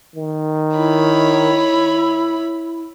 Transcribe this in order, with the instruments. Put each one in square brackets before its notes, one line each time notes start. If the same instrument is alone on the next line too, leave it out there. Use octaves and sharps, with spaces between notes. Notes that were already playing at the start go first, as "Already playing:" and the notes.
[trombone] D#3
[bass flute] E4 [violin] C#5 B5